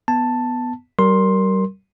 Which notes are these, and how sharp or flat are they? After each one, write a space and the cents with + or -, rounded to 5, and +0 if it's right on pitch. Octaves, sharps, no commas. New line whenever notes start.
B3 +0 A5 +5
G3 -40 A#4 +0 C6 +10